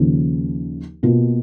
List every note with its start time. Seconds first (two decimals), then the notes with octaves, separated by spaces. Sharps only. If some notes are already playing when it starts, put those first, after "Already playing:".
Already playing: D#2 C#3 F3 A#3
1.03 B2 A#3 F4